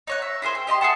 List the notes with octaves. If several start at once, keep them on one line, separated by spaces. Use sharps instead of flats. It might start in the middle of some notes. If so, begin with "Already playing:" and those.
D#4 C#5 F#5
E5
E4 G#4 A4 C5
G5
G4 D#5 A#5 C6
G#4 E5 F#5 A5